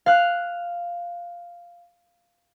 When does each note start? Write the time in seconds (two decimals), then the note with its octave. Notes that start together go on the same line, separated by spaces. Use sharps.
0.06 F5 F#6